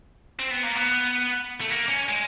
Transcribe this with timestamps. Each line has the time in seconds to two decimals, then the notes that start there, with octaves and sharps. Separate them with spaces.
0.39 C4
0.51 B3
0.64 A#3
0.75 B3
1.61 A3
1.70 A#3
1.89 C#4
2.09 G#3